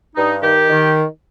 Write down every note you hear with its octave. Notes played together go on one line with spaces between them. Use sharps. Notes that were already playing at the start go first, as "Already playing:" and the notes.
G2 D#4
D#3 G4
D#3